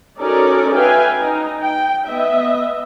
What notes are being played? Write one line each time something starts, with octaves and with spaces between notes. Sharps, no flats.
C#4 D#4 F#4 A4 A#4 D5
B4 E5 F5 G5 G#5
D#4
G5
B3 D#5 E5